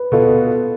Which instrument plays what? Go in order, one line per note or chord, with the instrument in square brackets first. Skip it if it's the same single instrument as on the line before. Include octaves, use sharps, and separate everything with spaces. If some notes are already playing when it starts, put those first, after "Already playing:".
Already playing: [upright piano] B4
[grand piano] B2 B3 F4 [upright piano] A4